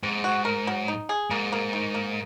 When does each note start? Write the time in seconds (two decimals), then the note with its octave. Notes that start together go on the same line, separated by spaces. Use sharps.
0.03 G#2 C4
0.24 F#4
0.45 A#4
0.67 F#3
0.88 D#4
1.09 G#4
1.30 G#2 A#3
1.52 A#3
1.73 D#3
1.94 A#3